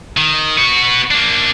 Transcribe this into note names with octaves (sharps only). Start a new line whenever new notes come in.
D#3
B3 F#4
A#3 D4